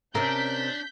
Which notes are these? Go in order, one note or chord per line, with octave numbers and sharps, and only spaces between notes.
C3 C#4 D4 A#4 G6 B6